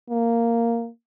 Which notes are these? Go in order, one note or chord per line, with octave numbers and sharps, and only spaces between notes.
A#3